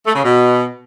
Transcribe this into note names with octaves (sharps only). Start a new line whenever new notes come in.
A3
C#3
B2